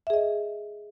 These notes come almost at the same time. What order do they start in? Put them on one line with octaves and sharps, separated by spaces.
E5 G#4 D#5